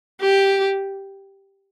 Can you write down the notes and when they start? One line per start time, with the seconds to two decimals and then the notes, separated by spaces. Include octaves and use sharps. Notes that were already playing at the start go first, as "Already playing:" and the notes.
0.21 G4